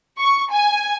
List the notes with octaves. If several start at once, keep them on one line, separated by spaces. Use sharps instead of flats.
C#6
G#5